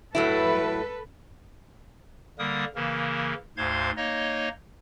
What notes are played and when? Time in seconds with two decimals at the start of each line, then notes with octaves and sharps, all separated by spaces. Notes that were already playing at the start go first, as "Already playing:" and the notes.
0.15 A2 F#3 E4 A4 B4
2.39 D3 G3 A#3 A#4 D#6
2.75 C#3 E3 A#3 A#4
3.57 D2 G#2 C5 F5 C6 G#6
3.97 A#3 D#4 C#5 D#5